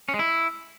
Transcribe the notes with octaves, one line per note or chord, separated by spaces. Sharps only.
C#4
G#3
E4